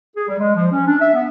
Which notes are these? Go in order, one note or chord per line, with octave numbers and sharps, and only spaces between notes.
G#4
G3
G#3
F3
C#4
D4
E5
B3